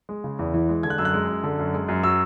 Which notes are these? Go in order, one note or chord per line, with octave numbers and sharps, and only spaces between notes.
G#3
C#3
E2
E3
G#3
D3 G#6
F#6
F#2 E6
F#6
G#3
F#2
D3
F#2
G#3
F#2
F#3 E6